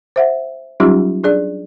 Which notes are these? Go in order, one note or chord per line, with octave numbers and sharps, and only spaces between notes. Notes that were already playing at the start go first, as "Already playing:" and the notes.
C5 E5 F#5
F#3 G3 C#4 D#4 F4 G4
D4 G#4 D5